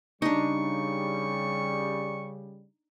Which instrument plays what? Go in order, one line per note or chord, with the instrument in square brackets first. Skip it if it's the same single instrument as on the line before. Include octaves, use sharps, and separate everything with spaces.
[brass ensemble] C#3 G3 [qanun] D4 D#4 [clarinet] C#6